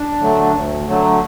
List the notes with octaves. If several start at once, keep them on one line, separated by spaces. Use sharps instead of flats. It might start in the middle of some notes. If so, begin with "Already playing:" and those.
Already playing: D4
D3 F#3 A3
D2
D3 F#3 A3